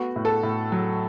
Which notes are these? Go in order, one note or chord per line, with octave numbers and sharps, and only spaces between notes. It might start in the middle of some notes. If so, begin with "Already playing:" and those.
Already playing: A3 B3 F#4
A2
A4
A2
F#3